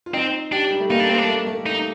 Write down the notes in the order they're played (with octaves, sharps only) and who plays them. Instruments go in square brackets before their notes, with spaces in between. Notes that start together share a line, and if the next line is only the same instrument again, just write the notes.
[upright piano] F4
[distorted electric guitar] C4 [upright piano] D#4
[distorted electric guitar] D4 [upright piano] G4
[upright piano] G3
A3
[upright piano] A#3 [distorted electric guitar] D#4
[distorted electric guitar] D4
[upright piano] A#3 [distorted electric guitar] C4
[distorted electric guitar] D4
[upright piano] A3
A3
[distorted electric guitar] D#4